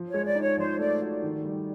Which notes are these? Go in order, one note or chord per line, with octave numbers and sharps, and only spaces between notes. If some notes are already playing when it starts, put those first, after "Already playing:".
Already playing: F3
C#5
G#3
D5
D#4
C#5
F3 C5
A3 D5
F#4
D#3
G3